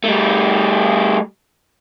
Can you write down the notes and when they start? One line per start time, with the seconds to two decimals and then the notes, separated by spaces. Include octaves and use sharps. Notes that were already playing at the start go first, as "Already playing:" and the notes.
0.04 G3 A3